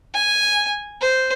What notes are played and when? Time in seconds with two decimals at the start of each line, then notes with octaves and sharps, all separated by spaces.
0.14 G#5
1.01 C5